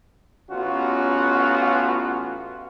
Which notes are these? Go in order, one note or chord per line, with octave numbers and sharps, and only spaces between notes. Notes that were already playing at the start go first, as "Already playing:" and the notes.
A1 B3 C#4 F4 F#4